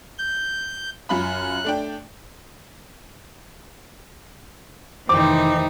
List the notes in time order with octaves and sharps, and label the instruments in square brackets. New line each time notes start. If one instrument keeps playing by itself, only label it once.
[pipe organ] G6
[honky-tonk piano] F#2 F4 B5 [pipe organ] F#6
[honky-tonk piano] A3 D4 G5
[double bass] F1 D#3 [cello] E3 D#4 [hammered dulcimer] G4 C5 [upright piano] D6